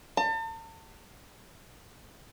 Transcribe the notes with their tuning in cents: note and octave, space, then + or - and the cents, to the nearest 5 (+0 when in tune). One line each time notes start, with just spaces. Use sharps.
A5 +40